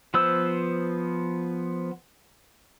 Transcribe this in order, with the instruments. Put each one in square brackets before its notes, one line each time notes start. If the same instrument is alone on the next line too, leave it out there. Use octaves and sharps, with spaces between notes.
[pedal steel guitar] F3 B3 B4 C5 E6